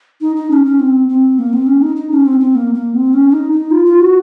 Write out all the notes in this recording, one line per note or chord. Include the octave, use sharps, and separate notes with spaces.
D#4
D#4
C#4
C#4
C4
C4
A#3
C4
C#4
D#4
D#4
C#4
C4
C4
A#3
A#3
C4
C#4
D#4
D#4
F4
F4
F#4